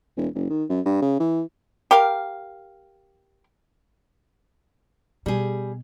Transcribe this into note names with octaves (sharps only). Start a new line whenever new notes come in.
E1
F#1
D#3
F#2
G2
C#3
E3
G4 A#4 F5
B2 G3 G#4